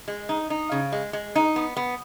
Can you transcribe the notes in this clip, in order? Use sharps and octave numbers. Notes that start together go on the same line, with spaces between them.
G#3
D#4
D#4
C#3
G#3
G#3
D#4
B3
B3